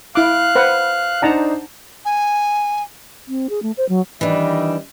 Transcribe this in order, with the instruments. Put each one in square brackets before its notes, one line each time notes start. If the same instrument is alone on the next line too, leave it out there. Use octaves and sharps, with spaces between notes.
[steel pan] E4 D6 [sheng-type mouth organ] F5 F#6
[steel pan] B4 C5 F#5
[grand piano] D4 D#4 C5 [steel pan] F#5 A5 A#5
[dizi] G#5
[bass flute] C4
G#4
A3
C5
F#3
[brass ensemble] D#3 G3 D#5 [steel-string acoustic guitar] E3 D4